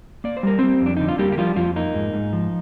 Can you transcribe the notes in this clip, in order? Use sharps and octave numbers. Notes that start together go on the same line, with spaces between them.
A#3 D5
C5
G3 A#4
G3 C4 C5
F2
D4
D3 D#4
F4
G3 A#3 G4
G4
F3 G3 F4
F2 F3 F4
A#3 D#4
G#2
G#2
F3